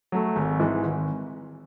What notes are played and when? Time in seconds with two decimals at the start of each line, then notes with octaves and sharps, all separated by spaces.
0.12 F#3 A3
0.36 G#1
0.60 G#2 E3
0.83 G#1